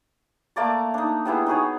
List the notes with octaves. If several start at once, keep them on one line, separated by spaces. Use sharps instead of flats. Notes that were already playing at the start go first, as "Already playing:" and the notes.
A3 A#3 D5 D6
D4 D#4
G3 B3 E4 G#4
D#4 F#4 G#4 C#5